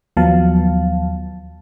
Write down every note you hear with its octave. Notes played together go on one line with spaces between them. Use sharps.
D#2 F3 F#3 B3 F5 A5